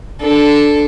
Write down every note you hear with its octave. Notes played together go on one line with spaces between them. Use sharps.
D4 A4